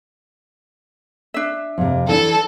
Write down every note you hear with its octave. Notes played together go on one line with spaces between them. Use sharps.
D4 E5
F2 C3
E3 D4 A4